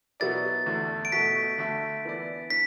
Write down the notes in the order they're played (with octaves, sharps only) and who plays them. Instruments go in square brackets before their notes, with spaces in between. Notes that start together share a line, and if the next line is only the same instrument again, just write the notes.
[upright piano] B2 F#3 B3 E4 D5 [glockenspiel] A6
[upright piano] E2 D3 A3 D4
[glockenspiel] D7
[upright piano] B2 A3 F#4 A4 [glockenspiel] B6
[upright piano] D3 A3 D4 A4 E5
E3 B3 E4 D5
[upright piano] D4 [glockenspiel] B6